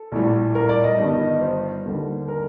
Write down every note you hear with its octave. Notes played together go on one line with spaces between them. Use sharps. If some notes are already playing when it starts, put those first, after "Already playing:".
Already playing: A4
A#1 A2 G3
A#4
D5
D#5
G1 G2 D#3 G3
C5
D#2 D3 G3
A#4